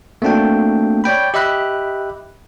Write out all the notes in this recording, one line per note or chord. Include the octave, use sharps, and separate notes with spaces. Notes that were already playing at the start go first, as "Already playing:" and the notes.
A3 A#3 C4 D4 F#4 G5
C#5 D5 G5 B5
G4 D#5 E5 B5 F#6